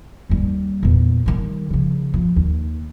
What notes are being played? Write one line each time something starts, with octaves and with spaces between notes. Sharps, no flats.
D#2 G3
E2 A#2
D#3 G3
C#3 F3
F3
D#2